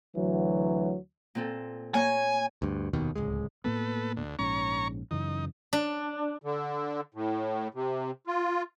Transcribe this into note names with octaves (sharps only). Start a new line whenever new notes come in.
D2 E3 F#3
A#2 C4 A4
A#3 C#5 G#5
D2 G2
F1 D#2 B2 D#3
D1 C#2 G#3
A2 A#3 B3 A4 B4
D2
A#1 G#2 C#4 C#5 A#5 C#6
F#2 C#3 E3 D#4
D4
D3
A2
C3
F4